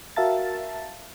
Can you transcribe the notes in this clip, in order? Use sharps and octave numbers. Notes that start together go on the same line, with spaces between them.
F#4 A#4 E5 F5 A5 A6